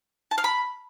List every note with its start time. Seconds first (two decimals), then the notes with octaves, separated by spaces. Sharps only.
0.31 A5
0.38 F5
0.44 B5